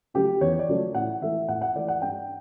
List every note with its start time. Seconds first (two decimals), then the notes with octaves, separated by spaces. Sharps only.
0.14 C#3 F#3 A3 G4
0.41 E2 C#5
0.59 D5
0.68 C#3 F#3 A3
0.94 A2 F#5
1.21 E3 A3 E5
1.48 A2 F#5
1.62 F#5
1.75 E3 A3 D5
1.88 F#5
2.02 G2 G5